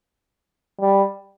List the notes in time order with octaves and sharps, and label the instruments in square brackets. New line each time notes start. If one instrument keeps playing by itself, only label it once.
[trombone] G3